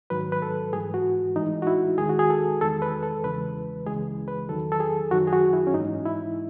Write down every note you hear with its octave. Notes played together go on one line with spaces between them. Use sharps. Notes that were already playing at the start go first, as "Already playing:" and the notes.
G#2 D#3 F#3 B4
B4
A4
G#2 E3 G#3 G#4
F#4
A2 E3 G#3 D#4
F#4
E4
D#2 D#3 G#3 G#4
F#4
G#4
A4
E2 D#3 G#3 A4
B4
A4
E2 C#3 E3 G#3 B4
C#2 C#3 E3 G#3 G#4
B4
E2 D#3 F#3 A4
A4
G#4
F#2 D#3 F#3 F#4
G#4
F#4
E4
C#4
G#2 E3 G#3 D#4
E4